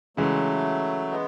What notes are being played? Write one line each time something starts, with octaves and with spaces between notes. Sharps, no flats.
C#3 E3 F#3 G#3 A3
G#3 B3